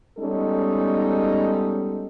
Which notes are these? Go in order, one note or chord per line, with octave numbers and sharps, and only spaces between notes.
G3 G#3 B3 C#4 D#4 A4